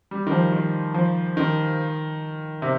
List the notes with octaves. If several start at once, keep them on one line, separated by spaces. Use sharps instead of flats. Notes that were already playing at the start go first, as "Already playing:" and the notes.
G3
D#3
F3
D#3
F3
D#3
C3